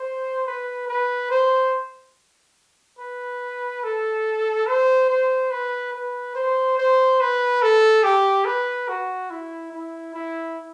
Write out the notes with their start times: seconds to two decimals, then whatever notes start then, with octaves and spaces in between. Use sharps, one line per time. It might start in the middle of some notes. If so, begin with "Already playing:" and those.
Already playing: C5
0.47 B4
0.88 B4
1.30 C5
2.99 B4
3.83 A4
4.66 C5
5.09 C5
5.51 B4
5.93 B4
6.35 C5
6.78 C5
7.20 B4
7.62 A4
8.03 G4
8.45 B4
8.88 F#4
9.30 E4
9.72 E4
10.14 E4